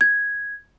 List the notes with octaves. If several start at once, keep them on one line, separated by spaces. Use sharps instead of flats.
G#6